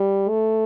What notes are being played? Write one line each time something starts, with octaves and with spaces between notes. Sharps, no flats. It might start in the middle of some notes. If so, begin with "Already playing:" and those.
Already playing: G3
A3